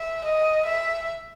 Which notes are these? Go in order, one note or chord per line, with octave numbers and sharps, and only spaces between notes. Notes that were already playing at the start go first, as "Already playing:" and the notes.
Already playing: E5
D#5
E5